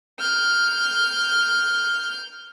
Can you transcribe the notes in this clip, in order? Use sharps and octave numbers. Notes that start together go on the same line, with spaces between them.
F6 G6